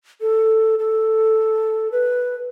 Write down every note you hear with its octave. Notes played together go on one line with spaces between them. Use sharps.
A4
A4
B4